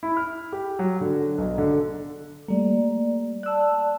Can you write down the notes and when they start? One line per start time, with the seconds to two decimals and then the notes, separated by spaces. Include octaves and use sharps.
0.03 E4
0.17 F6
0.52 G4
0.79 F#3
1.01 D3
1.38 B1
1.58 D3
2.48 G3 A3 A#3 D5
3.43 D5 A5 E6 F#6